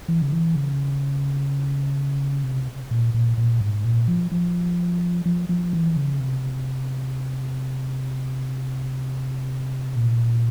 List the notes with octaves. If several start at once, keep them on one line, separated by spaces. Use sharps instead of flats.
E3
C#3
E3
C#3
C3
A#2
A#2
A#2
G#2
A#2
F3
F3
F3
F3
E3
C#3
C3
A#2